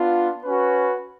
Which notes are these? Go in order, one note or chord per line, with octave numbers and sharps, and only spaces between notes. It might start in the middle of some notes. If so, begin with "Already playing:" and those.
Already playing: B3 D4 F4
C#4 F#4 B4